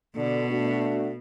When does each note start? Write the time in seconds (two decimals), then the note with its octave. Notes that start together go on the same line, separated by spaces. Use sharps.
0.16 B2 D3
0.50 A3 D4 F#4